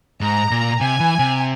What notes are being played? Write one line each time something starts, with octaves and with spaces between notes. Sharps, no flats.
G#2 A#5
A#2
C3 G#5
E3
C3